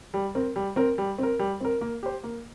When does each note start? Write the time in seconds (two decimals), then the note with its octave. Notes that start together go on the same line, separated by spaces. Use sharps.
0.14 G3
0.35 C4 A#4
0.56 G3
0.76 C4 A#4
0.98 G3
1.18 C4 A#4
1.39 G3
1.61 C4 A#4
1.81 A#3
2.03 G4 C5
2.24 A#3